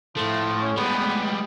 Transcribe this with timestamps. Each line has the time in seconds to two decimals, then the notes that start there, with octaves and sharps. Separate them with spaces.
0.17 A2 F3 A3
0.62 C#4
0.77 G3 G#3 B3